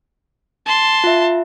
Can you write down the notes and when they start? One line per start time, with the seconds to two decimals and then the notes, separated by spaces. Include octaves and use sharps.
0.66 A5 C6
1.04 F4 E5